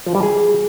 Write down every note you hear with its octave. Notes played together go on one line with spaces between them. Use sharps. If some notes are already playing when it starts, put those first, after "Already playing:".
F3
G3
G#4